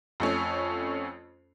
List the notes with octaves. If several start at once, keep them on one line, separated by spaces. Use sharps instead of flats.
F2 A3 C#4